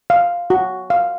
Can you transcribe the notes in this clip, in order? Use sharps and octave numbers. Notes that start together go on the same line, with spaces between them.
F5
F#4
F5